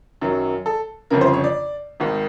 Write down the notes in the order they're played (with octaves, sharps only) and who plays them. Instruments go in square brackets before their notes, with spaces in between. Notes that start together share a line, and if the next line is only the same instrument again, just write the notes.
[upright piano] F#2 D#3 F#3
A4
G1 F2 C#3 A#4
C5
C#5
D5
G#1 G#2 D#3